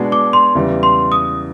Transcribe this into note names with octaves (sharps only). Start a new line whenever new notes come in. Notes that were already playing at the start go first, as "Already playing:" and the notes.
Already playing: B2 G#3 B3 D4 F#4
D6
C6
E2 C#3 E3 G3
C6
D#6